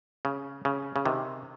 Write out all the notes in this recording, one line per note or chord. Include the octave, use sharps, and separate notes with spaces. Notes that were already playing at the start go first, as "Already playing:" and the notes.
C#3
C#3
C#3
C3 D#3